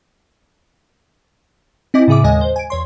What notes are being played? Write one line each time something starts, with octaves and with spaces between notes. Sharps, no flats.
C4 E4 D#5 G#5 D6
A2 C#3 G#4 E5 D6
D#2 G#3 D#5 G#5
C5
G#5 D7
E2 C#5 C6